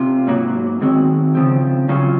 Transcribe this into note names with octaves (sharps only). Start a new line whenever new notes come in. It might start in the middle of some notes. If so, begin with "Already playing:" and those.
Already playing: C3 F4
G#2 F#3 A#3
D#3 G#3 C4 F#4
C#3 F3 C4
C#3 F#3 C#4 F4